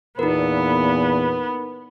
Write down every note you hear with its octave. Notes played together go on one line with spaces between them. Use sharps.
E2 A#2 B3 D#4 A#4 B4